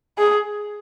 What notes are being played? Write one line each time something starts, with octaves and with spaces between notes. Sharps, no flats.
G#4